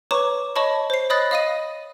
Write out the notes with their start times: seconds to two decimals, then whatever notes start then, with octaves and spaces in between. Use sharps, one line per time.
0.11 B4 C#5 A#5 C#6 D6 E7
0.56 C#5 D#5 A5 B5 C#6
0.90 C5 C7
1.10 C#5 D#5 B5 D#6 F#6 A6
1.31 D#5 F5 D#6 A#6 D#7